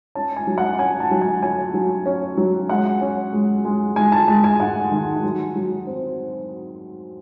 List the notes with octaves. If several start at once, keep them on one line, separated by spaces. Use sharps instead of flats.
C#4 A5
G#5
F#3
F#5
C#4 G#5
A5
F#3
G#5
C#4 G#5
F#3
C#4
F#3
G#3 F#5
C#4
G#3
G#3
G#3 G#5
A5
G#3 A5
G#5
G#2 F#5
D#3
F#3
F#3
C4